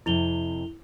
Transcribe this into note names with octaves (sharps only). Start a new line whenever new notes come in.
F2 C3 E4 F7 G7